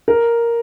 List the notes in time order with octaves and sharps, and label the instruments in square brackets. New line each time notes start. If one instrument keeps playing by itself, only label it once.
[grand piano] A#4